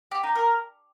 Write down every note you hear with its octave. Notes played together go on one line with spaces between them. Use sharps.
G4
D#4
A#4